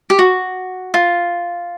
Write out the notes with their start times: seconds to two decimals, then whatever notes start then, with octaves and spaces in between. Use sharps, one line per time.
0.10 G4
0.19 F#4
0.94 F4